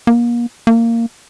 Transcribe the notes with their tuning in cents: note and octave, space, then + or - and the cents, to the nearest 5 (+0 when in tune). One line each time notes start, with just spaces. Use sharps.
A#3 +35
A#3 -15